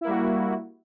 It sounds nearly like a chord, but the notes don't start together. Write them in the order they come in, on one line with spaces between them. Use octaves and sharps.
E4 A#3 G3 F#4